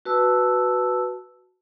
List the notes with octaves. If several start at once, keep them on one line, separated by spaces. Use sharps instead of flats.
F#4 B4 A5 E6